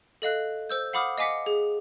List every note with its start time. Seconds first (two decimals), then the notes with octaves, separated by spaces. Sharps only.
0.22 A4 D#5 F5 F#6
0.70 C5 E6 G6
0.93 F5 F#5 B5 D6 D#6 F6
1.18 D#5 F5 G#5 D6 B6 C#7
1.46 G#4